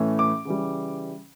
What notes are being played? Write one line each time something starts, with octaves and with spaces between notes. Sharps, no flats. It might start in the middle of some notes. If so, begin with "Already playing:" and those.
Already playing: A2 E3 A3 C#4
D6
C#3 E3 G3